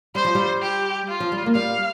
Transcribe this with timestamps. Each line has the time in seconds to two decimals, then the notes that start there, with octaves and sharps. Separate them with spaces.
0.15 G3 C5
0.25 F3
0.35 G3
0.62 G4
1.08 F4
1.20 F3
1.32 G3
1.46 A#3
1.55 G3 F5